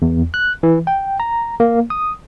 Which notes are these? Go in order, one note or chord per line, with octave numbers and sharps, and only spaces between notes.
E2
F#6
E3
G5
A#5
A#3
D#6